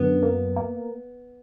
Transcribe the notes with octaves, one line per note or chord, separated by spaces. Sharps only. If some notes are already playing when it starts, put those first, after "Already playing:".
Already playing: F#2 D3 B3
A#3
A#3